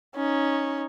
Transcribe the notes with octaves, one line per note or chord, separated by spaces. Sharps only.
C#4 D#4